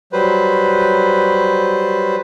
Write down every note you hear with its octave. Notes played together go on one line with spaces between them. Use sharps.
F#3 G3 B4 C5